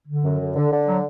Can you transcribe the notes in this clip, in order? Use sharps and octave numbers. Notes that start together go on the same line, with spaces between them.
D3
F#2
D3
D3
D3
F#3